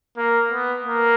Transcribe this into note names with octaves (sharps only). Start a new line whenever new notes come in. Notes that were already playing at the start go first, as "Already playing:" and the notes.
A#3
B3
A#3